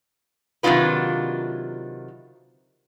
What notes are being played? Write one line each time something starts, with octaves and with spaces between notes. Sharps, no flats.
C3 D#3 F#3 D4 F4 B4